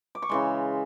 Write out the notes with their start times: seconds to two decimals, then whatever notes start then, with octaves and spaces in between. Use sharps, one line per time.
0.15 D6
0.22 C#6
0.29 C#3 E3 G#3 C6